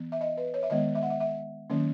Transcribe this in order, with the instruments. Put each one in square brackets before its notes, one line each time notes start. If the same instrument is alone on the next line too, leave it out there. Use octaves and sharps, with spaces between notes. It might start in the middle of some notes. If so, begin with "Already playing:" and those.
Already playing: [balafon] E3 B3
E5
D#5
B4
C#5
E5
D#3 G#3 B3 D#5
E5
F#5
E5
E5
D#3 F#3 A#3 C#4